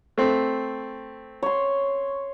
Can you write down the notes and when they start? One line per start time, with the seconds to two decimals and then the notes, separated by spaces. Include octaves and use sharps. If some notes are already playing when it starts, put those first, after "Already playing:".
0.18 A3 C4
1.43 C#5 C6